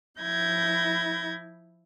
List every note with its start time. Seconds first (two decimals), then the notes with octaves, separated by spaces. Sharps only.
0.20 F3 E4 G6 G#6 A#6